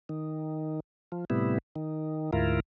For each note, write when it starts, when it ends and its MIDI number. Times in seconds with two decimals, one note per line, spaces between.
0.09 0.80 51
1.12 1.25 53
1.30 1.58 45
1.30 1.58 48
1.30 1.58 55
1.30 1.58 59
1.30 1.58 64
1.76 2.31 51
2.33 2.60 38
2.33 2.60 44
2.33 2.60 64
2.33 2.60 65
2.33 2.60 70